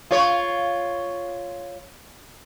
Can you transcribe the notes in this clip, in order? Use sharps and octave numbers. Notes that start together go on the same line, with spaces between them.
F4 C#5